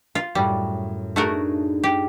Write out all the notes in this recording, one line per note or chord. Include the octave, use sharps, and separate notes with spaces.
F4
F#2 A2 G3
A3 D4 D#4 F#4 G#4 A#4
G4